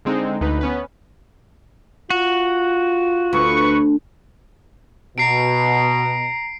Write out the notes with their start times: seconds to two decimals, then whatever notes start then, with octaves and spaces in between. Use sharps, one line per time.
0.05 D3 G#3 C4 D#4
0.41 D2 D#4 B4
0.61 B3 C#4 B4
2.10 F4 F#4
3.33 D2 B4 C#6
5.18 B2 A#5 C7 D7